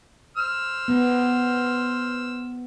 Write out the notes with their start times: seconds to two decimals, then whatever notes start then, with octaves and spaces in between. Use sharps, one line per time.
0.37 C5 E6 F6
0.88 B3